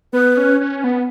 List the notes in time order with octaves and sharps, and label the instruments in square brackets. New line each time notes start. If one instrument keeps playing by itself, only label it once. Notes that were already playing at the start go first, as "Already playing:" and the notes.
[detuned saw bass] B3 [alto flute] B4
[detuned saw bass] C#4
C#4
B3